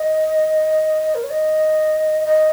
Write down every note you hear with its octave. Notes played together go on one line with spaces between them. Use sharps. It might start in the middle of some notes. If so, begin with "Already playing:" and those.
Already playing: D#5
A#4
C#5
D#5
D#5